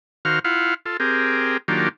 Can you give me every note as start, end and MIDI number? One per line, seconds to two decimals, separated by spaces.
0.25 0.39 51
0.25 0.39 66
0.25 0.39 72
0.25 0.39 77
0.25 0.39 89
0.44 0.74 64
0.44 0.74 65
0.44 0.74 77
0.44 0.74 78
0.86 0.97 65
0.86 0.97 69
1.00 1.57 60
1.00 1.57 67
1.00 1.57 68
1.00 1.57 70
1.68 1.89 51
1.68 1.89 54
1.68 1.89 58
1.68 1.89 62
1.68 1.89 65
1.68 1.89 67